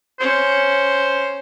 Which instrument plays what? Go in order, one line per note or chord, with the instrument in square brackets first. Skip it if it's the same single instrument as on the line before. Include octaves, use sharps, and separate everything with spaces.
[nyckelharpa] C#4 [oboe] C5